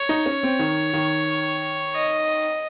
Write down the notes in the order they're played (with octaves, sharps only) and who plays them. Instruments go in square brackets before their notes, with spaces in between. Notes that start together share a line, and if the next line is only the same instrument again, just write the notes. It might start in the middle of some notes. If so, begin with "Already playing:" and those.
Already playing: [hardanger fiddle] C#5
[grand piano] D#4
C#4
C4
D#3
D#3
[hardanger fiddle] D#5